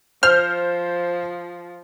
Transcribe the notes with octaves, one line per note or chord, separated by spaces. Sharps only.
F3 C5 F6 G6